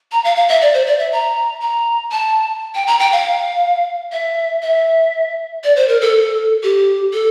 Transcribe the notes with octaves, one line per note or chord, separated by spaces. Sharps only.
A#5
F5
F5
E5
D5
C5
D5
E5
A#5
A#5
A5
G5
A#5
G5
F5
E5
E5
D5
C5
A#4
A4
G4
A4